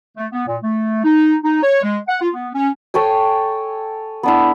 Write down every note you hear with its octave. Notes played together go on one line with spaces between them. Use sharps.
A3
B3
A#2
A3
D#4
D#4
C#5
G#3
F#5
F4
B3
C#4
A4 C#5 G5 G#5
B3 D4 E4